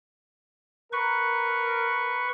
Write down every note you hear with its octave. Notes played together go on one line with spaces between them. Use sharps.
A#4 B4 C#6